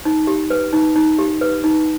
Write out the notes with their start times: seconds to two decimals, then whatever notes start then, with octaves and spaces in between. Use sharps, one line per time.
0.05 D#4
0.27 G4
0.50 B4
0.73 D#4
0.96 D#4
1.19 G4
1.41 B4
1.64 D#4